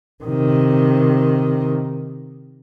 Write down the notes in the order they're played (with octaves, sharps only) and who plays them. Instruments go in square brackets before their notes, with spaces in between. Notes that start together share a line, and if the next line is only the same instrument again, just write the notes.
[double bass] C3 D#3